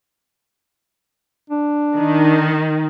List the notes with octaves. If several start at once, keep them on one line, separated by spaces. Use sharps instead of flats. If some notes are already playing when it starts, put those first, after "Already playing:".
D4
D#3